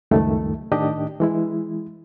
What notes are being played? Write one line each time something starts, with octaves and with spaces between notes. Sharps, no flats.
C#2 F#2 D#3 G3 A3
A2 D#3 D4 G4 D#5
E3 G#3 E4